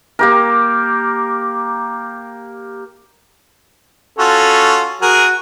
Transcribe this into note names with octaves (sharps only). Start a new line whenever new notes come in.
A#3 G4 A#4
C#4 F4 F#4 A4
F#4 G#4 A#4